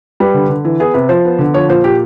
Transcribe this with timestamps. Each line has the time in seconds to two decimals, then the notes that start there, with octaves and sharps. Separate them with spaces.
0.20 G3 B4
0.34 D3
0.49 D3
0.65 E3
0.80 B3 G#4
0.94 C3 B4
1.09 F3 C5
1.25 B3
1.39 D3
1.54 F3 C#5
1.69 A#2 C5
1.84 A#2 G4